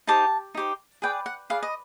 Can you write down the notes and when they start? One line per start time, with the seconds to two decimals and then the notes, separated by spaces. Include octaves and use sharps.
0.07 D#4 G4 C5 A5
0.55 D#4 G4 C5
1.02 G#4 B4 D5 G5
1.26 F#5
1.50 G#4 B4 D5 F5
1.63 D#5